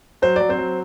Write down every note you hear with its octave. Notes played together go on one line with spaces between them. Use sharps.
F#3 C5
F#3 D5
C4 C5
F#3